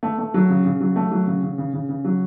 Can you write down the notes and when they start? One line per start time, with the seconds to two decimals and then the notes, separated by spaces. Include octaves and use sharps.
0.03 A3
0.18 A3
0.34 F#3
0.49 C#3
0.65 C#3
0.80 F#3
0.96 A3
1.11 F#3
1.27 C#3
1.43 C#3
1.58 C#3
1.73 C#3
1.89 C#3
2.04 F#3